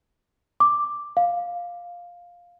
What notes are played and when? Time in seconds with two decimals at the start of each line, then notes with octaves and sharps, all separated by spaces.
0.60 D6
1.17 F5